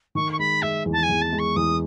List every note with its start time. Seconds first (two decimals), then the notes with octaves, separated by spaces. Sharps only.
0.15 D#3 C#6
0.32 C#6
0.39 G#3 B5
0.62 G#3 E5
0.85 E2
0.92 A5
1.03 G#5
1.09 E2
1.21 A5
1.33 G#3
1.39 C#6
1.56 E2 D#6